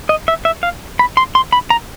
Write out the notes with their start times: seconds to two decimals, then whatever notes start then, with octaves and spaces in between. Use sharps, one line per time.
0.09 D#5
0.28 E5
0.45 E5
0.63 F5
0.99 B5
1.17 C6
1.35 C6
1.52 B5
1.70 A#5